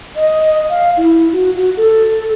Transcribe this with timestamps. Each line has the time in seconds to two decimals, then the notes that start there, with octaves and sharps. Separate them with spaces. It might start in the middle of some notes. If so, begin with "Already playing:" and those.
0.16 D#5
0.70 F5
0.97 E4
1.33 F#4
1.56 F#4
1.77 A4